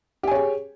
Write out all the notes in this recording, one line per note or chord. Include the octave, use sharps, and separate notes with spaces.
G4 G#4 C#5 G#5